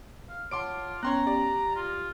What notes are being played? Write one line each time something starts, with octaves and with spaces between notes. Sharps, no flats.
F5
F4 C#5 F#5 A5 C6 D6 D7
B3 C#4 C#5 G5 A#5 C6 F#6
G4 D5
F4